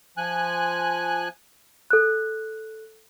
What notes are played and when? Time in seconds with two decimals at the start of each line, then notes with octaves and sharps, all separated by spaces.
0.17 F3 G#5 F#6
1.90 A4 F#6